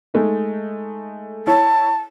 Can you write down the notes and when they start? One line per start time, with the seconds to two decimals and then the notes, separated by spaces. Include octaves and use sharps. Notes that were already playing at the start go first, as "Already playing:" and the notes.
0.14 G#3 A3 D#4
1.47 E4 C#5 A5